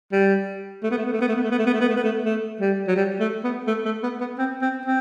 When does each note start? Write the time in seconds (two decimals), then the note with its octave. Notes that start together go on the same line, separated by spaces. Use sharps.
0.12 G3
0.83 A3
0.91 B3
0.98 A3
1.06 B3
1.13 A3
1.21 B3
1.28 A3
1.36 B3
1.43 A3
1.51 B3
1.59 A3
1.66 B3
1.74 A3
1.81 B3
1.89 A3
1.96 B3
2.04 A3
2.25 A3
2.61 G3
2.88 F#3
2.96 G3
3.20 A3
3.44 B3
3.67 A3
3.85 A3
4.03 B3
4.20 B3
4.38 C4
4.62 C4
4.85 C4